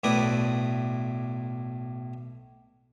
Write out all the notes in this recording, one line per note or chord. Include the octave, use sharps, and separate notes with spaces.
B1 A2 E4 B4 D5 D#6